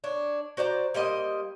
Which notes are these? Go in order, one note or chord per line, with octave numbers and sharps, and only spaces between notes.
D4 C#5
F#4 C5 D5 A#5
G3 A#3 C5 D#5